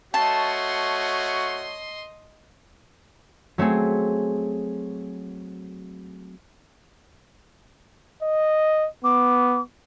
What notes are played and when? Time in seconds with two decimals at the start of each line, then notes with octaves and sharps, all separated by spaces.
0.14 A3 F#4 C#5 D#5 A5 C6
3.58 F#3 A3 C4 G#4
8.23 D#5
9.04 B3 D6